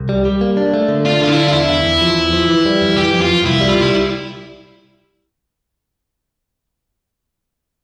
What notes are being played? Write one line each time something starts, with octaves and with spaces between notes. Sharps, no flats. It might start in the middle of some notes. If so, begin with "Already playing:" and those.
Already playing: C2
G3
G3
A#3
D4
A3
D3
D4 F4
D3 F4
E4
D4
F4
E2 E4
E2
E2
F3
E2
F3
E3
G3
F2
E3 G4
F2
F4
F2
C2 E4
G3
F4
C2 E4